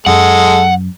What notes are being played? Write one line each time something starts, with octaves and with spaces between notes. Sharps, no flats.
F#2 F#3 G#3 A4 F#5